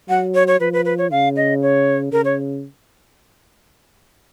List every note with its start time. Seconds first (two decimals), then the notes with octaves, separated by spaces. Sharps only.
0.09 F#3 F#5
0.35 C#5
0.48 C#5
0.60 F3 B4
0.73 B4
0.85 B4
0.98 C#5
1.11 C#3 F5
1.36 D#5
1.62 C#5
2.12 C#3 A#4
2.25 C#5